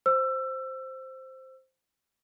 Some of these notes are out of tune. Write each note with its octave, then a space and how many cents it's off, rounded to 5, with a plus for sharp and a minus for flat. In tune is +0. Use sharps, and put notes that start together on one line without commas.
C5 +0 E6 +25